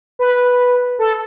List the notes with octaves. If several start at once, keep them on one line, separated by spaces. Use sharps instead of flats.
B4
A4